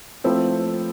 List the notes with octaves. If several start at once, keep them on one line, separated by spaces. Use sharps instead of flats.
F3 A3 C4 E4 A4